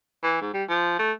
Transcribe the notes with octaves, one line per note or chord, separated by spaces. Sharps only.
E3
G#2
G3
F3
A3